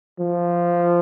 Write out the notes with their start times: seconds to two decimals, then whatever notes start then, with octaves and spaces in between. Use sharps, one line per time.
0.20 F3